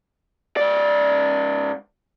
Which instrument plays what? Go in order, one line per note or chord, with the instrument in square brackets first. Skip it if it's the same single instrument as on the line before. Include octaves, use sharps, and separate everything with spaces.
[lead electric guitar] G#2 D5